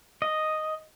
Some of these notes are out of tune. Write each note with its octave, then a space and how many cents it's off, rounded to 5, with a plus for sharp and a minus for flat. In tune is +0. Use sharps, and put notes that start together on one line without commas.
D#5 +0